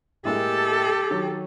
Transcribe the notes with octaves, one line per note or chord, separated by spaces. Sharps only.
A2 G#3 A#3 G4 A4
D#3 F#3 C#5